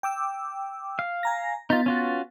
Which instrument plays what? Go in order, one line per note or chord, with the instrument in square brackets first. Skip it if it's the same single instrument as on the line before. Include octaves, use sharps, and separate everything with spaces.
[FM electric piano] G5 D6 E6
[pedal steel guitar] F5
[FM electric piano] G#5 A#5 A#6
[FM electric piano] B3 A6 [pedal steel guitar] D#4 F4
[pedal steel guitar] C#4 F4 F#4